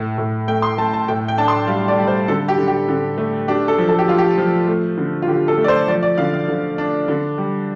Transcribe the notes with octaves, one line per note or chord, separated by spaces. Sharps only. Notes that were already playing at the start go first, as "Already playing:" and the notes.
Already playing: A2
A2
A3 G5
C6
A3 A5
A5
A2 G5
G5
D4 A5
C6
G3 F5
D5
G3
C5
D3 A4
G4
D3
G4
D3
A3
D4 G4
A4
F3
A4
G4
F3 F4
G4
F3
A3
D3
F4
D3 G4
A4
A3
D5
C5
F3 D5
D5
D3 F5
F5
D3
D4
D3
G3